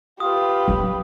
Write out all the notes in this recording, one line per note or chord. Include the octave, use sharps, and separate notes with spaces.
F4 G4 B4 D#6
F#3 E4